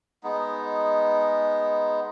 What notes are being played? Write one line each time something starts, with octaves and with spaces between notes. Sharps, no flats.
G#3 B3 D#4